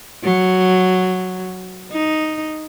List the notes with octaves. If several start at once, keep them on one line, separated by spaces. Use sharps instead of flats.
F#3
D#4